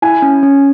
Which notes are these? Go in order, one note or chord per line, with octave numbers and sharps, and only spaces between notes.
E4 G#5
C#4
C#4